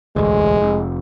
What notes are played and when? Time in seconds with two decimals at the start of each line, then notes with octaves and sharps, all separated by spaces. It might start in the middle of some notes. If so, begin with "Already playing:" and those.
0.16 E1 A1 D2 G#3
0.60 F1